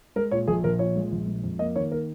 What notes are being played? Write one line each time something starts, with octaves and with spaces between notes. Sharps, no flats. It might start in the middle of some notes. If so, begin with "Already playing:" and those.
G#3 A#4
A#2 C#5
A#1 G#4
A#1 A#4
A#2 C#5
G#3
A#1
G#3
F2
A#3 D#5
D#3 C#5
A#3 A#4